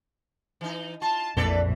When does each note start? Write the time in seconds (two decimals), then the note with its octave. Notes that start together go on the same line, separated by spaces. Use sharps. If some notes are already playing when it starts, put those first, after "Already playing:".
0.61 E3 D#4
1.02 F4 A5
1.37 A#1 F2 A#2 E3 A4 B4 D5